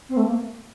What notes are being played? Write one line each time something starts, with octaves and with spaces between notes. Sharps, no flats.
C4
A3
A#3